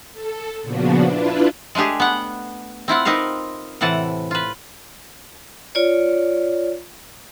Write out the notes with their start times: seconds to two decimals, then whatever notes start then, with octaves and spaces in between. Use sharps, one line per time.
0.13 A4
0.62 A#2 C#3 F3 B3 D4 F#4
1.06 D4 E4 F4 B4
1.75 G#3 A3 D4 G4 G#4
2.00 B3 F#5 G5
2.88 C4 E4 F4 F#5
3.05 C4 D#4 A#4 B4 F5
3.81 A2 C3 E3 F#5 A5
4.31 F4 B4
5.75 F4 C#5 D5